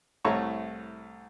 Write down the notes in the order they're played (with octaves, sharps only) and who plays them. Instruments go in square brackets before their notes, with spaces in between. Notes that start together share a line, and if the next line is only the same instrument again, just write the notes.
[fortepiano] C2 A2 A3 C#5 A#5 C#6